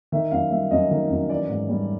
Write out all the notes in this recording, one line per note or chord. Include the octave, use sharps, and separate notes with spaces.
D#3 E5
F#2 F5
G3 E5
F#2 D#5
D#3
F#2
E3 D5
G#2
G3